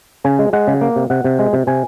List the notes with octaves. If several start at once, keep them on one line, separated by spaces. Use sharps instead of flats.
C#3 G#5
G#3
G#3 F#5
C#3
A#3
C3
C3 F#5
C3
G#3
C3
C3 G#5